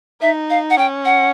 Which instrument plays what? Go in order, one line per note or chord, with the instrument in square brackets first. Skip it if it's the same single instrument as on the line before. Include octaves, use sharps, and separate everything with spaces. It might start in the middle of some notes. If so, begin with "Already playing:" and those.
[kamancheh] D#4 [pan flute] E5
[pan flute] F5
F#5
[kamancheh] C#4 [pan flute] G5
[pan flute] F#5